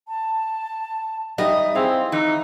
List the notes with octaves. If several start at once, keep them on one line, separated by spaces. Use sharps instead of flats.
A5
G3 B3 D#4 D#5 E5
C4 E4 G#4 F5
E3 D#4 A#5